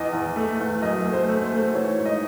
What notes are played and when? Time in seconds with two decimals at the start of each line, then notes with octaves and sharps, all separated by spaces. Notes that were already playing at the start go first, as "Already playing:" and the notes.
Already playing: E2 D#5
0.13 E2
0.36 A3
0.60 E2
0.82 F#2 D#5
1.06 A3
1.13 C5
1.28 A3
1.44 C5
1.52 A3
1.75 E3 C#5
1.98 G#2
2.05 D#5